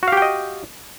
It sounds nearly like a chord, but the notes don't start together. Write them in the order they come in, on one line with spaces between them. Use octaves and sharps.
F#4 F5 G4 G5 D#5